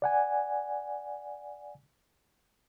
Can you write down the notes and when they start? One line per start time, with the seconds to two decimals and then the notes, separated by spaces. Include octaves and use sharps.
0.02 D5 F#5 G#5